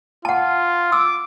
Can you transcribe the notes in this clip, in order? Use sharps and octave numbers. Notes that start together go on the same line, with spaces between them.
F4 F#5 A5
D6 E6